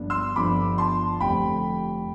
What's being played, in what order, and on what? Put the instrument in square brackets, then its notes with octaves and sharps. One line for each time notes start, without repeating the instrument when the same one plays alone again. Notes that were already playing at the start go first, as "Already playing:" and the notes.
Already playing: [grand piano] G1 G2 F3 B3 D4
C6 E6
G1 G2 F3 B3 D4 B5 D6
A5 C6
F1 F2 D3 G3 C4 G5 B5